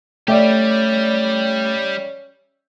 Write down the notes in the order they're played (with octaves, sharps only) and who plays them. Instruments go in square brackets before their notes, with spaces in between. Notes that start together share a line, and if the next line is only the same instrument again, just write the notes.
[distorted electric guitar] G3 G4 [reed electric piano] A3 [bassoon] C#4 [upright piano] D5 E5 G5